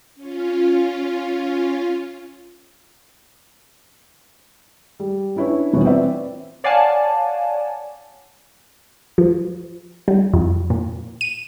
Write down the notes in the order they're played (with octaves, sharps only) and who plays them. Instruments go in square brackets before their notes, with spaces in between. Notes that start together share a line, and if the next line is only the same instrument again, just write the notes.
[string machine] C#4 F4
[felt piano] G3
C#4 D4 E4 B4 C#5
D#1 B2 E3 C#5
C4 B4 D5 E5
[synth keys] C#5 D5 F5 F#5 G#5 A5
[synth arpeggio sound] F3
G3
F2
A#2
D#7